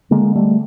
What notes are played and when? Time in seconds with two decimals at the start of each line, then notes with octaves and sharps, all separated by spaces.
0.11 D3 G#3 A#3
0.35 G3 A3